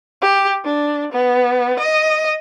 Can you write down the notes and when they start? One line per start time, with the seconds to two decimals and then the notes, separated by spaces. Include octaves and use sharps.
0.22 G4
0.64 D4
1.12 B3
1.79 D#5